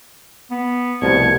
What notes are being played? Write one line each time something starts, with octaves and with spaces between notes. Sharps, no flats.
B3
C2 B2 F3 A3 G#6 C#7